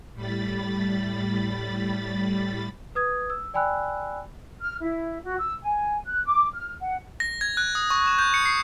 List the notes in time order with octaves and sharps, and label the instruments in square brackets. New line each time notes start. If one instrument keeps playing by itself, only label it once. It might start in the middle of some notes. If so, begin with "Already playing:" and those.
[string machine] A2 G3 B5 A6
[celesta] B4 D#6 G#6
E6
D5 G5 G#5 B5 E6 F#6
[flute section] F6
E4
F#4
E6
G#5
F#6
D6
F6
F#5
[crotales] A#6
G#6
F#6
D#6
C#6
E7
G6
C#7
C7